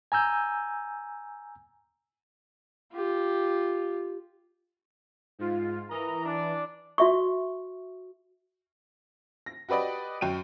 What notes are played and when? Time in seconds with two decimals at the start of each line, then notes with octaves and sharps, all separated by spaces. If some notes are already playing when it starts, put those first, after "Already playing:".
0.12 G#5 A#5 E6 G6
2.92 F4 G4
5.39 G#2 F4
5.90 E3 A#4 D#5 A#5
6.26 D4 D5
6.98 F#4 E5 C#6
9.46 A#6
9.69 F#4 G4 B4 D5 D#5
10.21 F#2 G5 D#7